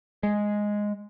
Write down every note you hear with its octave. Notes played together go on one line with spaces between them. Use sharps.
G#3